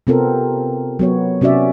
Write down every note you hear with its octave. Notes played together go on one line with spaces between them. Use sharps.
C3 B3 C4 F4 A4 A#4
F#3 B3 C#5
C3 C#4 F#4 D5 E5